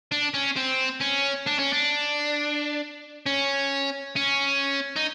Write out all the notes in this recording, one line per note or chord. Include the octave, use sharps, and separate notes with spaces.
D4
C#4
C4
C#4
D4
C#4
D4
C#4
C#4
D#4